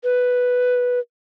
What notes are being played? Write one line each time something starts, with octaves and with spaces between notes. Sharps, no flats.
B4